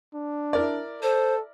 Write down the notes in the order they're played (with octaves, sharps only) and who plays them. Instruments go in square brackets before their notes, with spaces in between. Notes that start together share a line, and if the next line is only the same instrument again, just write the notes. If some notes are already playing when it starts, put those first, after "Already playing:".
[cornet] D4
[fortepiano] E4 A#4 D5
[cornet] A4 [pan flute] C5